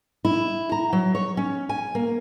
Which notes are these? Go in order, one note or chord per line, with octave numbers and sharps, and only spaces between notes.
E4
A#5
F#3
C#5
C#4
G#5
A#3